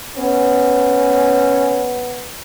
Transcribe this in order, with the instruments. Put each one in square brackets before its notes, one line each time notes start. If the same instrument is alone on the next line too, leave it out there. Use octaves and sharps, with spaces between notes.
[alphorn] B3 [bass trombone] C#4